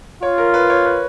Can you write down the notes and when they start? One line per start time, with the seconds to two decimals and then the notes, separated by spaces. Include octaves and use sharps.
0.22 F4 C#5
0.38 A#4
0.54 B4
0.70 C#5
0.86 B4